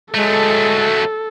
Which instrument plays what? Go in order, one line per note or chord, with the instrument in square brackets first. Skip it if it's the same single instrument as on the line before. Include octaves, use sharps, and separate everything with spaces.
[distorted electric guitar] F#3 A3 [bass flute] G#3 [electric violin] A4